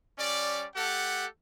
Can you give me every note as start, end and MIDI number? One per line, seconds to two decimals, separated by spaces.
0.18 0.66 55
0.18 0.66 61
0.18 0.66 74
0.75 1.26 57
0.75 1.26 67
0.75 1.26 69
0.75 1.26 78